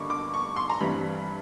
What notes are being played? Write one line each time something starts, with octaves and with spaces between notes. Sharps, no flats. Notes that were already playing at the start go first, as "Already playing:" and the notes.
Already playing: G2 D3 A#3 D#4 C#6 D6
D6
C#6
C6
A#5
G2 E3 G3 C4 B5